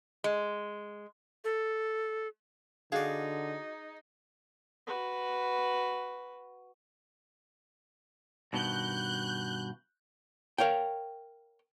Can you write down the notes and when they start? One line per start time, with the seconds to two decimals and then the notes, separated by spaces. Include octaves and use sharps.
0.24 G#3
1.44 A4
2.92 D3 D#4 F#4 G#4 D5 F5
4.86 F#4 B4
8.53 G2 B2 D#3 F#6 G6
10.58 A#4 C#5 F5 G5